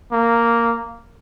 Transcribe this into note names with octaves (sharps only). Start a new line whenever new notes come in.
A#3